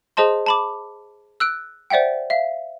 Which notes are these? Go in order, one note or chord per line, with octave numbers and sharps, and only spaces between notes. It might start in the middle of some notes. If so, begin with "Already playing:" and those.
G#4 C5 D#5 A5 C6
A5 B5 D6
E6 F#6 D7
C5 D5 E5 F#5 G5
E5 F5